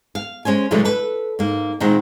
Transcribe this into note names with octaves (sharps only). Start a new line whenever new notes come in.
F5
G#3 C#4 C5 G#5
A#2 D3 E3 F#3 G#3 A3
A4 B4
G#2 A#3
A#2 D#3 G#3 C4 F#5